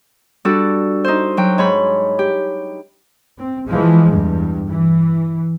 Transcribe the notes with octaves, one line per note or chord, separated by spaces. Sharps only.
G3 D4 F#4 A4
D#4 C5
F#3 G5
G#2 C#5 B5
G4
C4
E3 F3 G#3
E2 G2
E3